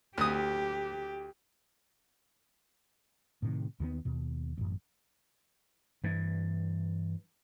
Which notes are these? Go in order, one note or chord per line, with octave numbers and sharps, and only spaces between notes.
D2 G4 D#6
A2 C3 D#3
D#2 D#3 F3 B3
D#2 B2
A1 F#2
G2 E3